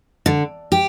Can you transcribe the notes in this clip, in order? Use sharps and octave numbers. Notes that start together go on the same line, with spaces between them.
D3
G4